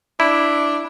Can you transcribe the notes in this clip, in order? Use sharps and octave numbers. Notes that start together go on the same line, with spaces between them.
D4 E4